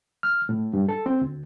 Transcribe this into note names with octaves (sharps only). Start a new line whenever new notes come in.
F6
A2
G2
A4
C4
D2